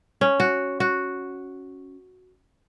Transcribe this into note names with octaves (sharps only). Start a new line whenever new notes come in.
C#4
F#4
F#4